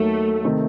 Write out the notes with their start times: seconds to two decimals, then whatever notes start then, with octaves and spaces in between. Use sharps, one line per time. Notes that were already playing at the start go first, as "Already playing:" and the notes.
Already playing: D#2 D#3 F#3 A3
0.44 C3 D#3 A3 C4